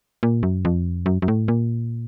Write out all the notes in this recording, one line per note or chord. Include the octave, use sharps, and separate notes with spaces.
A#2
F#2
F2
F#2
F#2
A2
A#2